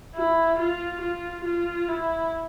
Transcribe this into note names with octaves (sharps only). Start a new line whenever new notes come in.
E4
F4
F4
F4
E4